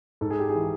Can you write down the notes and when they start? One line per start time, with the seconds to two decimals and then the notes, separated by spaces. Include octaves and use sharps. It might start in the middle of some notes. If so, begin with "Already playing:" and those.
0.21 G#2 A4
0.31 G#4
0.40 G4
0.49 G#4
0.55 E3